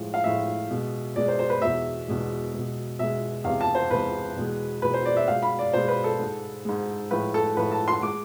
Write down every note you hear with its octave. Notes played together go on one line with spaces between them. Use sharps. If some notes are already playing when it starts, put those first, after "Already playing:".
Already playing: A2 F3 G#3
F5
A2 F3 G#3 E5
B2 G#3
B2 G#3 D5
C5
C5
B4
E2 B2 G#3 E5
E2 B2 G#3
B2 G#3
B2 G#3 E5
E2 C3 G#3 F5
A5
C5
E2 C3 G#3 B4
E2 B2 G#3
E2 B2 G#3 B4
C5
D5
E5
B2 G#3 F5
B5
D5
B2 G#3 C5
B4
A4
G#2 G#3
G#2 G#3
A2 F3 G#3 B4
A4
A2 F3 G#3 B4
A5
C6
G#3 D6